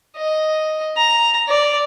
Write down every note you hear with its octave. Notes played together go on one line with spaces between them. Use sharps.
D#5
A#5
D5